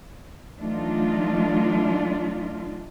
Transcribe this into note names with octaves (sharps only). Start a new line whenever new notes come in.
E3 F#3 A3 D4 D#4 F4